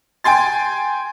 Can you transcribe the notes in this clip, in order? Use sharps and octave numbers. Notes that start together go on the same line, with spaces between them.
G5 G#5 C6 A6